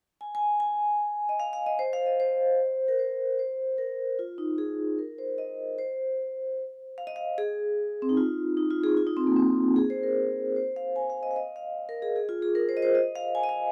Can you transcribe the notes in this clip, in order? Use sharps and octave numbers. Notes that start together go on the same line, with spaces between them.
G#5
G#5
G#5
D#5
F5
F5
D#5
C5
F5
D#5
C5
A#4
C5
C5
A#4
F4
D#4
G#4
A#4
C5
D#5
C5
F5
D#5
F5
G#4
C4
D#4
F4
D#4
F4
G#4
F4
D#4
C4
A#3
C4
G#4
C5
A#4
C5
F5
G#5
F5
D#5
F5
D#5
F5
A#4
G#4
G#4
F4
G#4
A#4
C5
D#5
C5
D#5
F5
G#5
D#5
F5